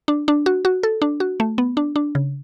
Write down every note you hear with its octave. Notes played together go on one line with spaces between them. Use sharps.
D4
D4
F#4
F#4
A4
D4
F#4
A3
B3
D4
D4
C#3